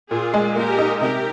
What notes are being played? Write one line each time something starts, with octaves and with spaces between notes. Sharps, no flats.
A#2 F4 G#4
G#3
A#3 G4 A#4
D#4
C3 G4 A#4